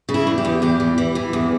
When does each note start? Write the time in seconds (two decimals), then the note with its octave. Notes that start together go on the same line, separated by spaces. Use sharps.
0.09 C#3
0.14 E4
0.27 E2
0.38 G4
0.45 E2
0.62 E2 G4
0.80 E3
0.98 E3
1.15 E3
1.33 E2